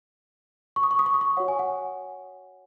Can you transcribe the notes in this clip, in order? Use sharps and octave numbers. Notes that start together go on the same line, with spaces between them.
C#6
D#6
C#6
D#6
C#6
D#6
C#6
F#4 C#5 F#5
G#5
F#5